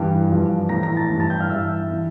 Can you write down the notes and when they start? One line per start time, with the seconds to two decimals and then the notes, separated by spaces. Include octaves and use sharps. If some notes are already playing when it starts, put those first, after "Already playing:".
Already playing: G2 E3 G5
0.29 G2 F3
0.69 A2 E3 A#5 A#6
0.83 A#5 A#6
0.97 A5 A6
1.10 G2 E3
1.20 A5 A6
1.30 G5 G6
1.40 F5 F6
1.50 G2 E3 E5 E6
1.91 E3